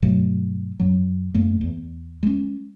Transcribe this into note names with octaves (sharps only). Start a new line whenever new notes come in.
G2 B2 F#3 A3
F#2 F#3
F#2 A3 A#3
E2
G#3 C#4